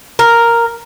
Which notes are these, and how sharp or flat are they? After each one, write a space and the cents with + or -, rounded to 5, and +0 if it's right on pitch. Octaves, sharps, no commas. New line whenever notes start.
A#4 +0